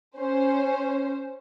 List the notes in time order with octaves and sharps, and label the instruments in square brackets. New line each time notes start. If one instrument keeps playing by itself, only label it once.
[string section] C#4 C5